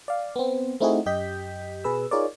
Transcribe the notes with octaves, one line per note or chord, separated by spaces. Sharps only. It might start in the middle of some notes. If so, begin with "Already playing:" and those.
D5 F5
B3 C4
A3 C4 D#4 E4 F#4 G#4
F#2 G4 D#5 G6 B6
B2 G#4 B4 E6
D#4 F4 G#4 A#4 C#5 D5